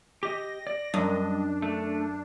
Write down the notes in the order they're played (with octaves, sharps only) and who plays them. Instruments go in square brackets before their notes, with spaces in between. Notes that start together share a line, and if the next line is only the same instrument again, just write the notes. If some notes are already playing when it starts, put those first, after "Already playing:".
[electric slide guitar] G4 D#5 [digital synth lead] A#6
[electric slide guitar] D5
[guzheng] F#2 [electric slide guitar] G3 D#5 [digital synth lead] D4
[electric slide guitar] A3